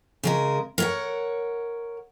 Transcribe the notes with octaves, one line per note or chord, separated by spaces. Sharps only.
C#3 G#3 A#4
A#4 C#5 F#5